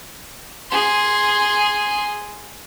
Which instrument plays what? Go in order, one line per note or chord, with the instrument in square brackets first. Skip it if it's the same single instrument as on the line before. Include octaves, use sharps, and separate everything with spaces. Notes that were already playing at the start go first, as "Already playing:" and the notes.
[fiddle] G#4 C6